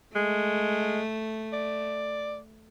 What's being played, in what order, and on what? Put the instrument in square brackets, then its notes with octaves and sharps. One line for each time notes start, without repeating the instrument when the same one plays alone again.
[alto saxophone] G#3 [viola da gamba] A3
[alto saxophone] D5